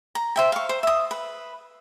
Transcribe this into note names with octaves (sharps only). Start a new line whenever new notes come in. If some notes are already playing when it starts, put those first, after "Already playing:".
A#5
C5 E5 G5
F5 C#6
C5
E5 D#6
B4